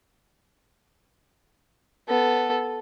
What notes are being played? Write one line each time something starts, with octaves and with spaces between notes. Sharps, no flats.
B3 A4